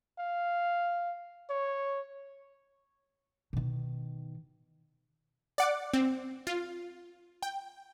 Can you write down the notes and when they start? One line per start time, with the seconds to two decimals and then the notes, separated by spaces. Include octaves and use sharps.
0.19 F5
1.50 C#5
3.53 B2 D#3
5.58 D5 F#5 D6
5.93 C4
6.47 F4
7.42 G5